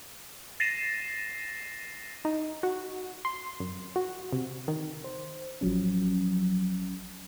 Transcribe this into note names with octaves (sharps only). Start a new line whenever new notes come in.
A6 A#6 C7 D#7 E7
D#4
F#4
C6
F#2
F#4
C3
D#3
C5
A1 F3 F#3 C#4